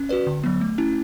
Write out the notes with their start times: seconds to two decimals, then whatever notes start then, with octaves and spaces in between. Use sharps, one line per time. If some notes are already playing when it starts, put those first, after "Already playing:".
Already playing: C#4
0.09 F#4 B4 D5
0.27 D3
0.44 F#3 B3
0.61 A3
0.78 C#4 E4